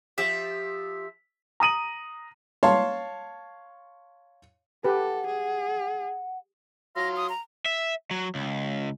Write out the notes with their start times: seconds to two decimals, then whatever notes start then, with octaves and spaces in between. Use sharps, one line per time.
0.18 F3 G4 E5
1.60 A#5 D#6 D#7 F#7
2.63 C#5 F5 A5 C6
4.84 G4 A4 B4 F#5
5.27 G#4
6.96 F#3 F5 C6 A#6
7.16 D#6
7.29 A#5
7.66 E5
8.11 F#3
8.35 C#2